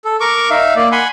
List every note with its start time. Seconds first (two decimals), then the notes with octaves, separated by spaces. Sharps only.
0.05 A4
0.20 A#4 C#6 D6
0.50 D#4 E5 F5
0.76 A#3 D5
0.92 F#5 G#5 B5 C6